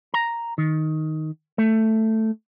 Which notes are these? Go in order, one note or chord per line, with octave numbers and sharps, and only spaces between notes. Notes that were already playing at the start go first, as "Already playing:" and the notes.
A#5
D#3
A3